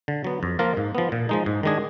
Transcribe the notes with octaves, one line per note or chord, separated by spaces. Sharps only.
D3
F#3 B3
F2
F3 A#3 F4 A#4
G#2
F3 B3
A#2
F3 G#3 D#4
G#2
D#3 G#3 D4 G#4